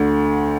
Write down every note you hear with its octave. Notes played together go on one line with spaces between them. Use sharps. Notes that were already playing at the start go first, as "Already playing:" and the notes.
Already playing: D2 D3